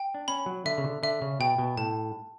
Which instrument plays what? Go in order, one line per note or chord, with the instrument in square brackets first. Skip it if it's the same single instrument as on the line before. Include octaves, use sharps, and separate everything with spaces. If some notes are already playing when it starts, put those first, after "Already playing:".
Already playing: [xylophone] G5
[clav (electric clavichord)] D4
[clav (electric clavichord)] C#4 [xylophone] B5
[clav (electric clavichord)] F#3
[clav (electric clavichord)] D3 [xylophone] E5
[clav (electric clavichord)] C#3
D3
[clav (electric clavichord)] D3 [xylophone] E5
[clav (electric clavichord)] C#3
[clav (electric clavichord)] B2 [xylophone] G5
[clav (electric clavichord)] B2
[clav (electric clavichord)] A2 [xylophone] A5